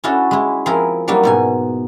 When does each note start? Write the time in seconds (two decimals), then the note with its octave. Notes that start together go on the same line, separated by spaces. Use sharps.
0.04 C#4 D4 E4 F#4 A4
0.31 G#3 E4
0.66 F3 C4 E4 G#4 A#4
1.08 F#3 G3 A#3 D4 D#4
1.23 G#2 B2 G#5